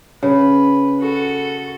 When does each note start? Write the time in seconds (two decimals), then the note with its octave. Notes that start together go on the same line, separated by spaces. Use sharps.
0.23 C#3 B4
1.00 F#4 A4